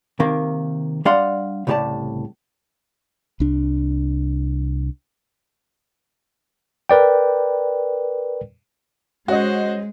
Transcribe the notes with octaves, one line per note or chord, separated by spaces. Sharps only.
C3 D#3 A#3
G3 D4 D5 F5 F#5 C6
C2 A2 C#3 G4 D5 A5
C2 D4
A#4 B4 D5 G5
G#3 C#4 F#4 C5 C#5 D#5 F#5